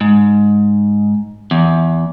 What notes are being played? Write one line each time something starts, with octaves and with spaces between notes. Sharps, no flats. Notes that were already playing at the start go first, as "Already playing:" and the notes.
G#2
E2